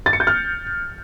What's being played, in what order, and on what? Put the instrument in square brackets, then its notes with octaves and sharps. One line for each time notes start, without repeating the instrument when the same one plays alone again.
[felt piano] A6
C#7
G6
F6